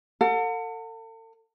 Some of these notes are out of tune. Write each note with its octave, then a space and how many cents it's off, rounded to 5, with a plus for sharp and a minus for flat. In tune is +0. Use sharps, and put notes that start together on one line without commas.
A4 +40 F#5 -40